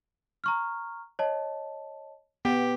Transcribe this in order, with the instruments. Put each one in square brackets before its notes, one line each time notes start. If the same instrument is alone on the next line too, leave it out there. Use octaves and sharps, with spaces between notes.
[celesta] A#5 C#6 F6
C#5 D#5 A5
[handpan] B3 [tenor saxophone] G4 [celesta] F#5